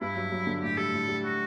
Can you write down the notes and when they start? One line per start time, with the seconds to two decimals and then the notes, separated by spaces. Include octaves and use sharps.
0.01 G2 E4
0.16 F#3
0.32 F#3
0.47 D3
0.62 A2 G4
0.77 G3 A4
0.93 A2
1.08 G3
1.24 F#4